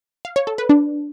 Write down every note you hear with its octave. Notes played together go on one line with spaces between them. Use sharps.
F5
C#5
A4
B4
D4